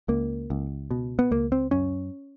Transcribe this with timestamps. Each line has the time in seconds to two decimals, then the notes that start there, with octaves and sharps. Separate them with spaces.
0.08 C#2 A#3
0.50 C#2
0.91 B2
1.19 B3
1.31 C#2 A#3
1.52 C4
1.71 F#2 C#4